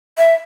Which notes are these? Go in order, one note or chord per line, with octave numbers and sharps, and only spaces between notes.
E5